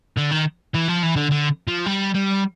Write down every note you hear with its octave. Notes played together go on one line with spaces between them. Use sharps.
D3
D#3
E3
F3
E3
D3
D3
F3
G3
G3